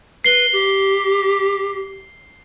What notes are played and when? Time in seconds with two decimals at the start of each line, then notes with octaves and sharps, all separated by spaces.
0.24 B4 C7 G7
0.53 G4